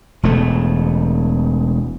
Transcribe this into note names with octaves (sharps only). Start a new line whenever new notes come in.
E1 E2 A3